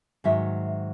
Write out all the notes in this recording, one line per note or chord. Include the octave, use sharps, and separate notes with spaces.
G#2 D#3 F#3 E5